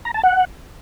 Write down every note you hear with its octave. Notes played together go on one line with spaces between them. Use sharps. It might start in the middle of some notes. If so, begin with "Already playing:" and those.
A#5
A5
F#5